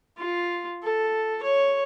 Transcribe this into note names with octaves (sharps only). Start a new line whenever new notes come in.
F4
A4
C#5